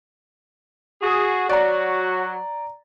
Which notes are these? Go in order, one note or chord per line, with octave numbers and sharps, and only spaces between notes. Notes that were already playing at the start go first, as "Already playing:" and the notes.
F#4 G#4
F#3 F#4 D5 A#5